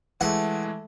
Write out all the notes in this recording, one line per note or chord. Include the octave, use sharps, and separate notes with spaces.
E3 G#3 A3 F#5